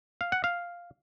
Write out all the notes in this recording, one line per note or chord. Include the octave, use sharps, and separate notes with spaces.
F5
F#5
F5